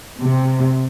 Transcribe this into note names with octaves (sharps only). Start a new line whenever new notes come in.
C3